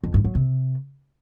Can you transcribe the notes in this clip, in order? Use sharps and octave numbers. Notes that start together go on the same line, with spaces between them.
F2
G2
F#3
C3